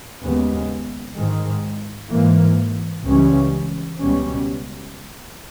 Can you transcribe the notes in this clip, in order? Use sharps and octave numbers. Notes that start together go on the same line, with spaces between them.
D#2 C#3 G#3 B3
G#2 D#3 G#3
G#2 E3 A#3
C#2 C#3 E3 G3 C#4
C#2 B2 G3 C#4